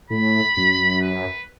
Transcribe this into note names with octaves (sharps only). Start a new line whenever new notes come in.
A2 B5
F#2
B4